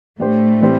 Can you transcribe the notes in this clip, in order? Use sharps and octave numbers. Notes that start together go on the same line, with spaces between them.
A2 G3 A3 D4 G4 C5
E3 G3 C4 G4 C5